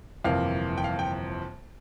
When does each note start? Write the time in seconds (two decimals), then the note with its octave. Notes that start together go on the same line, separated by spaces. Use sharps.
0.25 G1 F2 C3 E3 A#3 F5
0.78 G5
0.84 F5
0.99 G5